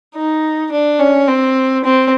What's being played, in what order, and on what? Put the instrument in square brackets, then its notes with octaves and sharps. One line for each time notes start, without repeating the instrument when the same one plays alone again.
[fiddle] D#4
D4
C#4
C4
C4